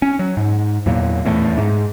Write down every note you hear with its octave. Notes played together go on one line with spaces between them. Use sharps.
C#4
F#3
G#2
E2 A#2 F#3 A#3
D#1 E2 A2 A3
G#2